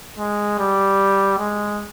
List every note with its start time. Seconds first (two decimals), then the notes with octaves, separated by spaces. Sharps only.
0.18 G#3
0.59 G3
1.39 G#3